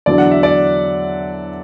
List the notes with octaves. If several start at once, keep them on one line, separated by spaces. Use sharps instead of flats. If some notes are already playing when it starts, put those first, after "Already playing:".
E2 D3 F#3 D5
F#5
E5
D5